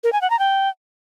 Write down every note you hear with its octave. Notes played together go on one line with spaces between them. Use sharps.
A#4
G#5
F#5
A#5
G5